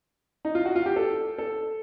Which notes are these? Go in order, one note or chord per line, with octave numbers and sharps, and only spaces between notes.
D#4
F4
F#4
F4
G4
A4
A4